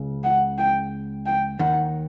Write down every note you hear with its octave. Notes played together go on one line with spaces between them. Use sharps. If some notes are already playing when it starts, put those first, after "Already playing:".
Already playing: C#2 C#3
F#5
G5
G5
D#2 D#3 F#5